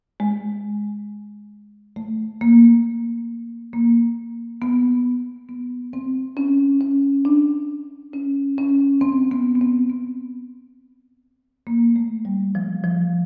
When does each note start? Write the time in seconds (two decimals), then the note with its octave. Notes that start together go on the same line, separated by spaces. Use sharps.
0.20 G#3
1.96 A3
2.41 A#3
3.73 A#3
4.62 B3
5.49 B3
5.93 C4
6.37 C#4
6.81 C#4
7.25 D4
8.13 C#4
8.58 C#4
9.01 C4
9.31 B3
9.55 B3
9.61 C4
9.90 B3
11.67 A#3
11.96 A3
12.25 G3
12.55 F3
12.84 F3